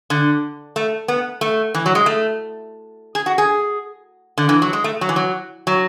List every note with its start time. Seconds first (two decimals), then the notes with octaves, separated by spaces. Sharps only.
0.10 D3
0.76 A3
1.08 B3
1.41 A3
1.74 E3
1.86 F#3
1.95 G#3
2.06 A3
3.15 G#4
3.26 F#4
3.38 G#4
4.38 D3
4.49 E3
4.62 F#3
4.73 G#3
4.84 A3
5.01 F#3
5.09 E3
5.16 F#3
5.67 F#3